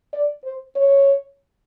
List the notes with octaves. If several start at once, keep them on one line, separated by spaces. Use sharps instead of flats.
D5
C5
C#5